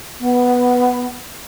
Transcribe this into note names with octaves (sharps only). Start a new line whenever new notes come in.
B3